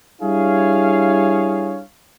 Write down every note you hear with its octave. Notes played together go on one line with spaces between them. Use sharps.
G3 D4 E4 G#4 C#5 F5